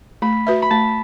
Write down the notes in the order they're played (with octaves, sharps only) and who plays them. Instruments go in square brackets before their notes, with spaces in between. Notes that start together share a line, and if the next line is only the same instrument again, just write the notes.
[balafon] A3 [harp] B5
[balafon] F#4 B4 E5
[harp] B5
[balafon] A3 [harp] A5